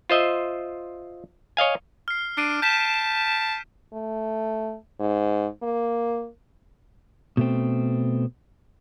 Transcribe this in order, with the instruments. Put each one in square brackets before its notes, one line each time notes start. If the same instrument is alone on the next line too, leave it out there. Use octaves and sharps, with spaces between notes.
[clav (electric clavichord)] F4 C5 D#5 E5
C#5 D#5 F5 G#5
[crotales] F6 C7
[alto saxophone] D4 [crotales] C7 D7 D#7
[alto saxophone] A5 [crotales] G6 B6 E7
[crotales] E7
[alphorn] A3
G#2
A#3
[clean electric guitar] B2 A3 C4